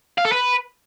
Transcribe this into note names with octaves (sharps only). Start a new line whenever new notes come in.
F5
A4
B4